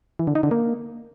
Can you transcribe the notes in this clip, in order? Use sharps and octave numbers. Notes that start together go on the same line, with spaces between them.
E3
D3
D#4
D3
A#3